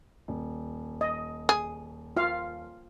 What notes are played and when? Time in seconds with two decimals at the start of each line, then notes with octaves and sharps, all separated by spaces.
0.28 D#1
1.01 D#5
1.49 G#4
2.17 F4 F5